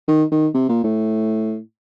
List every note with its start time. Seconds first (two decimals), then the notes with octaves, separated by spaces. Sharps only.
0.08 D#3
0.31 D#3
0.54 C3
0.69 A#2
0.84 A2